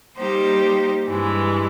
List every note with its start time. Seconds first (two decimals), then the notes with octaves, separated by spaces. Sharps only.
0.17 G3 A#3 D#4 G4 C5
1.08 G2 E3 G#3